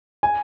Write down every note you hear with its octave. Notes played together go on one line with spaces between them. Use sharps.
G#5